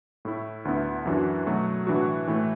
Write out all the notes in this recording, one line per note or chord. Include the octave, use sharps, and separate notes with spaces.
A2 A3 E4
D2 D3 B3 E4
F#2 E3 D4 F#4
B2 F#3 A3 F#4
A2 E3 D4 F#4
A2 E3 A3